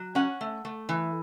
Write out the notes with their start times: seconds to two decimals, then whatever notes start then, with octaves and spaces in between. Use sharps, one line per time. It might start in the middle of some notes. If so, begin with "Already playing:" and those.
Already playing: F#3
0.15 C#4 F#5
0.41 A3
0.65 A3
0.89 E3